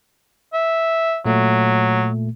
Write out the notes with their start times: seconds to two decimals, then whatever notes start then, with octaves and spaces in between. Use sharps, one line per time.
0.54 E5
1.26 A#2 F#3 A3